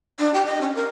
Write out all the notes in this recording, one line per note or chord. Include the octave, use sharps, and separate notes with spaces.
D4
G4
D#5
C#4
A#4